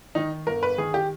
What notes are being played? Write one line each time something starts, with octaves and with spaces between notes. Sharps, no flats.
D#3 D#4
G1 A#4
B4
D#3 G#4
G4